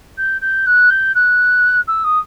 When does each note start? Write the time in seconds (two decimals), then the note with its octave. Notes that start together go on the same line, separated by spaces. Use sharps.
0.17 G6
0.41 G6
0.66 F#6
0.90 G6
1.15 F#6
1.88 E6
2.04 D#6